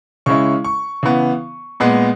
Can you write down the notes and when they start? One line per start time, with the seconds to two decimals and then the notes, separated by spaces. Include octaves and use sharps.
0.26 C#3 G#3 C#4 E4 C#6
0.64 C#6
1.03 C#3 E3 B3
1.80 A#2 G#3 B3